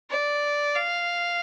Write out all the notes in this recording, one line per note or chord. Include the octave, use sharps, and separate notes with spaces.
D5
F5